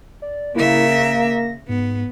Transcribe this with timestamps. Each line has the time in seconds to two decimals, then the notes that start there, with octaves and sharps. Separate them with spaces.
0.22 D5
0.56 C#3 A#3 E4 E5
0.91 A#6
1.69 G#2 B3